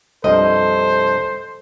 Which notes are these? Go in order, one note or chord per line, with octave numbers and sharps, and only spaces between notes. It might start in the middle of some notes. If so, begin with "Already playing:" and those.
C2 G2 F3 A4 C5 D#5